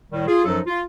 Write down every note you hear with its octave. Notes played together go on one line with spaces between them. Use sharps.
A2 D#3 G3
F4 G#4
F#2 F3 F#3 D#4 A4
F4